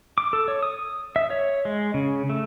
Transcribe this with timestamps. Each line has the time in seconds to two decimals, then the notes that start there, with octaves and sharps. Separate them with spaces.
0.18 D6
0.33 A4
0.48 C#5
0.63 D#6
1.16 E5
1.30 C#5
1.65 G#3
1.94 C#3
2.30 A3